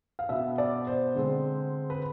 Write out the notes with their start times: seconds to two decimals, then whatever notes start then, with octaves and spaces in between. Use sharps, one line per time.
0.19 F5
0.29 B2 B3 E5
0.58 D5
0.87 C5
1.15 D3 G#3 C4
1.90 B4